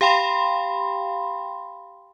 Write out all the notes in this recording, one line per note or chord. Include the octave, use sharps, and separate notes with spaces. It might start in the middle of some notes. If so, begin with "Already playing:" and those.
G4 F5 G5 B5 C6